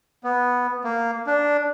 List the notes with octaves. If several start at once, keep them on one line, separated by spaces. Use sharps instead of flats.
B3
A#3
D4